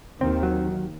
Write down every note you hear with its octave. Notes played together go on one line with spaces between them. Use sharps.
D#2 D#3 C4
F#3